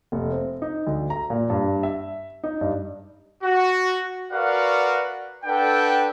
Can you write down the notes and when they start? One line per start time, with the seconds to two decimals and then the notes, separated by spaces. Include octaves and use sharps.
0.12 F1
0.30 C4
0.62 D#4
0.87 D2
1.10 A#5
1.30 A#2
1.50 G2
1.83 E5
2.43 D#4
2.61 G2
3.43 F#4
4.32 F#4 A#4 B4 D5 F5 F#5
5.45 D4 A4 B4 F#5 G5